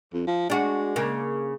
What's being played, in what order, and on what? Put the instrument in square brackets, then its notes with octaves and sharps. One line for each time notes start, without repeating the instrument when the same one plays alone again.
[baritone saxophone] F2
F3
[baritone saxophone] G#3 [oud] D4 F#4
[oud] C#3 A#3